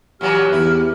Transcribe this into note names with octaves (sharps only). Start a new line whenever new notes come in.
A#2 E3 F#3 G4 F6
E2 E4